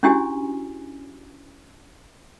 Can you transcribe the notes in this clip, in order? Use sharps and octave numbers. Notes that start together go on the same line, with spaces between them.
C#4 D4 E4 F#4 G4 G#5